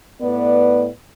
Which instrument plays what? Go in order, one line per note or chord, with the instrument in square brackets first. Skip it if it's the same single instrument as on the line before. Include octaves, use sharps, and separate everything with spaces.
[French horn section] A2 B3 B4 D5